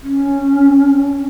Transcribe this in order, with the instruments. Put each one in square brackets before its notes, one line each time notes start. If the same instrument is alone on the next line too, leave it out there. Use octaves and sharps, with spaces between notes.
[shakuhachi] C#4